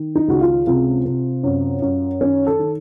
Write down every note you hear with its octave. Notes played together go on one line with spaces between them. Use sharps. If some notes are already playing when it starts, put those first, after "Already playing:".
Already playing: D#3
D#4
C#2 F#4
F4
C3 F4
C3
F#2
F#2
D#3 C#4
A4
D#3